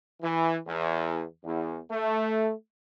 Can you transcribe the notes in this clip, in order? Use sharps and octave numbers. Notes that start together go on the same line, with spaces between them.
E3
E2
E2
A3